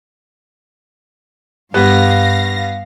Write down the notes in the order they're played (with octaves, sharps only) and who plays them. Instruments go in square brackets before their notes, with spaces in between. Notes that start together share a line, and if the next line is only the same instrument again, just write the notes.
[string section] G2 F5 A#6 [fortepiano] G3 B3